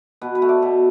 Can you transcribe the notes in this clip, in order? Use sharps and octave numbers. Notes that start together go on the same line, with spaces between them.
B2 B4
B4
A3
D5
B2